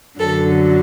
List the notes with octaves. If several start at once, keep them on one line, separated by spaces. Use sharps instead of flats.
F#2 D3 F#3 A4